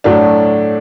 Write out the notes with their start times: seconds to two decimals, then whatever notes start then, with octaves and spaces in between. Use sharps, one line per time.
0.04 A2 F#3 A3 D4